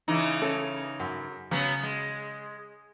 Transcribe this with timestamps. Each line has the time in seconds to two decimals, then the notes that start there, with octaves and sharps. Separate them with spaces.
0.08 C#3 E3 D#4
0.41 C#4 A4
1.00 F#2
1.51 C#3 F#3 B3
1.83 G#3